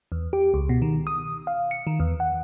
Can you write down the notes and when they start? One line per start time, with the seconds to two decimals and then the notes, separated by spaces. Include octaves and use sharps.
0.12 E2
0.33 G4
0.54 C#2
0.69 B2
0.82 D#3
1.07 D#6
1.47 F5
1.71 C#7
1.87 D#3
2.00 E2
2.20 F#5